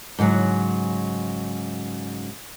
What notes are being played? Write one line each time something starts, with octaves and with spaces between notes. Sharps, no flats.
G#2 C#3 F3 F#3